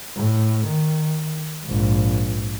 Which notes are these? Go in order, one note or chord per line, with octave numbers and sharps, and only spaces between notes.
A2
D#3
A#1 G#2